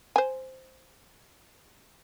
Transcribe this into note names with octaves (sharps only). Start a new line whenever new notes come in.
C5 G#5